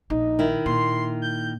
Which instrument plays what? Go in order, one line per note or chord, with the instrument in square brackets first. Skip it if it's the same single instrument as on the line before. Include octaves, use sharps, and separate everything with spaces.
[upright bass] A#1 [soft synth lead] D#4
[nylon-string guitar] D#3 E4
[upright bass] A#2 [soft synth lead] C6
[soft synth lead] G6